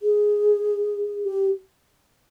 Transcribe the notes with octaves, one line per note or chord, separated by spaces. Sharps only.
G#4
G4